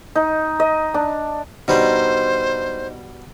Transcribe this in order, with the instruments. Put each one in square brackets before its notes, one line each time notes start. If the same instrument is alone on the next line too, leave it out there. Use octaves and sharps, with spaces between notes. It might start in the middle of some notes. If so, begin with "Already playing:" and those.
[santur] D#4
D#5
D4
[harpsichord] B2 G3 D4 [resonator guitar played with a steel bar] D#4 [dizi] C5